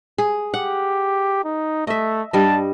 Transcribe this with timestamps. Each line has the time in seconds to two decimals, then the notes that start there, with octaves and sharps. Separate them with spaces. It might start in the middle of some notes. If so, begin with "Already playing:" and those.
0.18 G#4
0.54 G4 F#5
1.45 D#4
1.87 A3 D#5 E5
2.33 G2 G3 D#5 A5